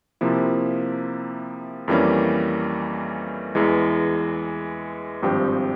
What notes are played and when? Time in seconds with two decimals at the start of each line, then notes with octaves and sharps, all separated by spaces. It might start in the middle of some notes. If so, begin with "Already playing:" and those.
0.21 C3 F3 A#3 E4
1.88 F2 E3 G3 A#3 C#4
3.55 E2 E3 G#3
5.22 G#1 G2 F3 C4 G4